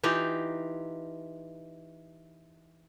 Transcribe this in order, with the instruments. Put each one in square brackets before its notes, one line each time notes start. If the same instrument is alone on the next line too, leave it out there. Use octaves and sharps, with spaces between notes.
[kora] E3 D#4 F4 G4